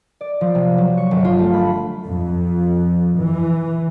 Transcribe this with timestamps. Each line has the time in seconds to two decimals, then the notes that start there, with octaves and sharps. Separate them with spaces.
0.21 D5
0.41 F3
0.55 C3
0.78 F#3
0.97 C#6
1.11 G1
1.25 F4
1.39 A3
1.53 B5
2.06 F2
3.16 E3